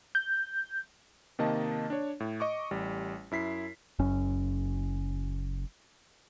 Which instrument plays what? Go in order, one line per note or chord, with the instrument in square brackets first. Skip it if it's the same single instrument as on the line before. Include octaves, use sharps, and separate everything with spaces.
[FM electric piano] G6
[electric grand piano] C3 D#3 A#3 D#5 A5
D4 C#5
A2
D#5 C#6 D6
A1 G3
F#2 E4 B6 C7
[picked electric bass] F#1 F#2 C#4